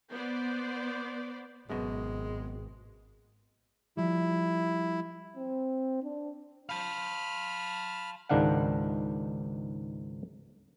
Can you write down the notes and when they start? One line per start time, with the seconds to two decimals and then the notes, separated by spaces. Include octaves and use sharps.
0.11 B3 C5 D5
1.70 G#1 F#2 B2 G#3
3.97 F3 G3 E4
5.36 C4
6.03 D4
6.69 F5 A5 B5 F6
8.29 C#2 G#2 D#3 D4 F5 F#5